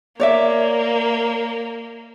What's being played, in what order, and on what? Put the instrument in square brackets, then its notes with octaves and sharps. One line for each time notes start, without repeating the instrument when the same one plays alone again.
[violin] A#3 [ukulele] C#5 D5 E5